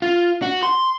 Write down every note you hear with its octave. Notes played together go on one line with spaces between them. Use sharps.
F4
F#4
C6